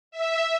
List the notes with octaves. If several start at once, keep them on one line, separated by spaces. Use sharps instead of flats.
E5